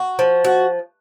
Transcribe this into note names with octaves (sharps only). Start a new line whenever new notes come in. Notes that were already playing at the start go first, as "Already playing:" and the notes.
Already playing: F#4
F3
F#4